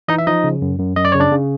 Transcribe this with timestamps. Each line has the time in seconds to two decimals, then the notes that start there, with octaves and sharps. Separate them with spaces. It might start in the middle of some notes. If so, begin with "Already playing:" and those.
0.08 E3 D#4 D#5
0.18 E5
0.27 F3 D#4 D#5
0.44 C#3
0.62 F#2
0.79 F#2
0.96 F#2 D#5
1.05 D5
1.12 C#3 C#5
1.20 D4 D5
1.32 C#3